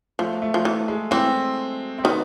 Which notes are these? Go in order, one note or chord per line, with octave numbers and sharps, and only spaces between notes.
F3 A3
A3
F3
E3 A3
G#3
E3 C4
C4
D#3 B3